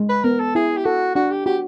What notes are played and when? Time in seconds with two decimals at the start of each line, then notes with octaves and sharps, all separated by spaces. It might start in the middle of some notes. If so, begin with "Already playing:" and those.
Already playing: G#3
0.09 B4
0.24 B3 A#4
0.40 A4
0.55 E4 G#4
0.77 G4
0.85 F#4 A4
1.15 D4 F#4
1.31 G4
1.46 F#4 G4